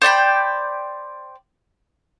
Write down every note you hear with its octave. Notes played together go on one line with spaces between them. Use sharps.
C5 D5 G5 B5